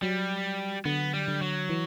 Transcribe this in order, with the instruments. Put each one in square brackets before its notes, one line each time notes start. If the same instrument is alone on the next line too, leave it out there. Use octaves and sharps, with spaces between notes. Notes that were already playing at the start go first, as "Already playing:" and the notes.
[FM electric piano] F#3 [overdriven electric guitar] G3
[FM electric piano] D3 [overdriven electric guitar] B3
[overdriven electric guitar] G3
[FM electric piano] D3
[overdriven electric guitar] F#3
[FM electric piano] E3